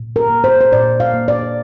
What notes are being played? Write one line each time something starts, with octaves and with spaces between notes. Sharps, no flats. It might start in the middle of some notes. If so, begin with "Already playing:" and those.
Already playing: A#2
A#4
A#3
C5
C5
A#2 D5
F5
A#3
D5